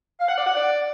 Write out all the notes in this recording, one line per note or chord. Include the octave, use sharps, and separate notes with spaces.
F5
F#5
D5
F#5
D5